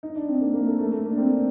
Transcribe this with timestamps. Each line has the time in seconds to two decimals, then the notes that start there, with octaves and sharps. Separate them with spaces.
0.03 D#4
0.16 D4
0.28 C4
0.41 A#3
0.54 A#3
0.67 A3
0.79 A3
0.92 A3
1.05 A#3
1.12 D4
1.18 C4
1.30 D4